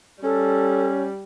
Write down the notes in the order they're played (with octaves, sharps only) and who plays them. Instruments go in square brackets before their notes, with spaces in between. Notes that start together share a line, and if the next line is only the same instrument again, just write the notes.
[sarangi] G3 [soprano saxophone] C#4 [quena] A4